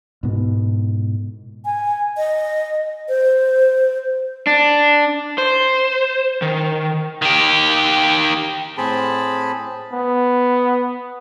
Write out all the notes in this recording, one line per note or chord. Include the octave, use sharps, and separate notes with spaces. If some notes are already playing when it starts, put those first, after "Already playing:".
G#2 B2
G#5
D#5
C5
D4
C5
D#3
D#3 G4
A2 C4 G#4 A5 B5
B3